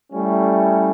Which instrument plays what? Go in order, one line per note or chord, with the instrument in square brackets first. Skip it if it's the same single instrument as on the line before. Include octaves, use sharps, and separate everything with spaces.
[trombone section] G3 A3 C#4 E4